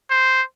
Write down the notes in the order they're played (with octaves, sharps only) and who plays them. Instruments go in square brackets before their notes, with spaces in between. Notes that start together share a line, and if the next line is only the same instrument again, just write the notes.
[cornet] C5